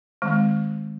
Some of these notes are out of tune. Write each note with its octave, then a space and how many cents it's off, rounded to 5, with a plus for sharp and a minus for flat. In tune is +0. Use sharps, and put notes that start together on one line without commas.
D#3 -15 G#3 +0 C4 +0